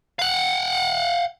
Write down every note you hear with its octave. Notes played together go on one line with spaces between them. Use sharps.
F5 F#5